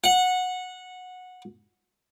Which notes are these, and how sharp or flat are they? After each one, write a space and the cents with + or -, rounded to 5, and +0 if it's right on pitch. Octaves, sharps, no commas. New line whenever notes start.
F#5 -15